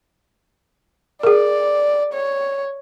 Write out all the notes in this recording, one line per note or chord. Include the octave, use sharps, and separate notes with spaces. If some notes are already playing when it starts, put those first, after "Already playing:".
G#4 A#4 D5
C#5